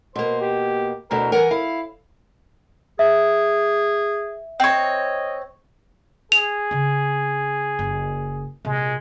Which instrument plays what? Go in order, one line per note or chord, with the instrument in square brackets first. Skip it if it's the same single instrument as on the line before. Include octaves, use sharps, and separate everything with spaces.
[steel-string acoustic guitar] B2 A#3 [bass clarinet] C5
[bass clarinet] G4
[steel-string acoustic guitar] D2 B2 D3 [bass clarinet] A#4
[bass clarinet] E3 [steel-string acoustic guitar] A#4 F#5 G#5
[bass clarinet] E4 [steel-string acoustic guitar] F5
[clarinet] G#4 [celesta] E5
[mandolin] C4 C#5 [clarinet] D#5
[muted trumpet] G#4 [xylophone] F7
[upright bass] C#3 C4
F#1
[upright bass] A#1 C3 [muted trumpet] G#3